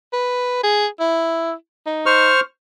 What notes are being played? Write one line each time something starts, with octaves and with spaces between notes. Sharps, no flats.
B4
G#4
E4
D#4
C5 C#6 F6